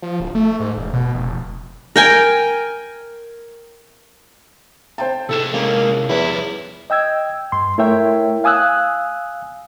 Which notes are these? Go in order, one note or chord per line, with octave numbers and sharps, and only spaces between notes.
F3
D1
A3
G#2
E1
B2
F1
F1
A#4 G5 G#5
C5 G5 A5
C3 E4 G#4 A4 E7
G#3 A#3 C#4
E2 F3 G3 E4 B4 C#5
D#5 G5 E6 G#6
G2 C6
A3 E4 A#4 C#5 E5 G5
F5 G#5 D#6 E6 F#6